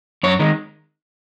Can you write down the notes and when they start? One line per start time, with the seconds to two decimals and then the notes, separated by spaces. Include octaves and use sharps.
0.23 F#2 C#5
0.39 D#3 G#3